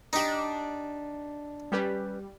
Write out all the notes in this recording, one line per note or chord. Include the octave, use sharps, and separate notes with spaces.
D4 D#4 G4 D#5
G3 C#4 G4 B4